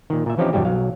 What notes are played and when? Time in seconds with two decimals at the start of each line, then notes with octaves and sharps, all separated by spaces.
0.10 A#2 D#3
0.26 A#2 E5
0.38 E3 F3 C4 C#4 D#4 G4
0.53 E2 G2 B2 G3 G4
0.65 B1 F#3 F5